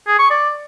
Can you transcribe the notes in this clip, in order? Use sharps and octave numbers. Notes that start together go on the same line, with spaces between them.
G#4
C#6
D5